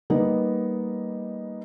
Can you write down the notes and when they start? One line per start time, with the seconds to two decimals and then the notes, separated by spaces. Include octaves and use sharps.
0.10 G3 A#3 B3 D#4